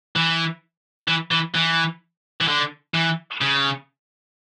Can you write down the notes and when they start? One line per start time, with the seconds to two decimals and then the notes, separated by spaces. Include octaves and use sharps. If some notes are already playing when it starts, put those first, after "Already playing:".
0.16 E3
1.08 E3
1.31 E3
1.55 E3
2.41 E3
2.48 D3
2.94 E3
3.41 C#3